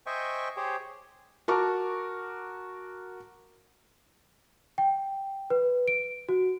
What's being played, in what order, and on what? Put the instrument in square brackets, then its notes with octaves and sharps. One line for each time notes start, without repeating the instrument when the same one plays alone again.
[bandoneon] C5 D#5 E5 G5 G#5 C#6
G4 G#4 C5 C#5 G5
[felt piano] F#4 A#4 A5 C#6 D6
[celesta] G5
B4
D7
F#4